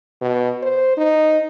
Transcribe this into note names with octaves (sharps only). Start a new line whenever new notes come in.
B2
C5
D#4